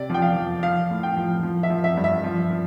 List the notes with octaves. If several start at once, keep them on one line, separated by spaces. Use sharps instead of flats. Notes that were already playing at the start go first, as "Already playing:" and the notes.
Already playing: C3 D5
F3 G5
F5
F3
F3 F5
A2
G5
F3
F3
E5
F3
E5
G2
E5
F3
F3